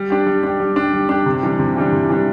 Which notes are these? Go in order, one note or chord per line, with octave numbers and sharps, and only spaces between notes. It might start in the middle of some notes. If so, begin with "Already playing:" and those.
Already playing: G3
D4 G4
G3
D4 G4
G3
D4 G4
G3
D4 G4
C3
E3 G3 D4
C3
E3 G3 D4
C3
E3 G3 D4